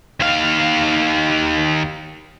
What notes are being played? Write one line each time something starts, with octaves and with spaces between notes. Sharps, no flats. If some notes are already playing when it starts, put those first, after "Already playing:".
D#2 F5